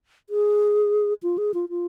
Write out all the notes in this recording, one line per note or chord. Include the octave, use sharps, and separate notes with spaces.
G#4
F4
G#4
F4
F4